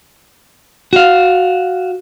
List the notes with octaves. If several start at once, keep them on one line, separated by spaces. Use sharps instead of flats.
F#4 F5